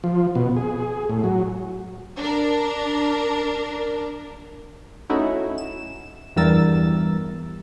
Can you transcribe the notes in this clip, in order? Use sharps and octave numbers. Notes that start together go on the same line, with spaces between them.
F3
B2
G#4
A2
F#3
D4 A#4
A3 C#4 D#4 E4 F#4
E7
E2 G2 G3 A#4 E6 A6